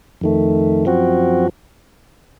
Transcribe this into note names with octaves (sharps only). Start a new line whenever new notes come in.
F2 D#3 A3
F#2 F3 C4 F#4